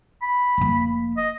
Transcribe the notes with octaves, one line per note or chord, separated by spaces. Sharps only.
B5
F1 A#3
D#5